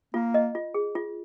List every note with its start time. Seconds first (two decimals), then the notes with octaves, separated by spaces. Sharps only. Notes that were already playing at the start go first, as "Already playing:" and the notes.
0.14 A#3 F4
0.34 D#5
0.55 F4
0.74 G#4
0.95 F4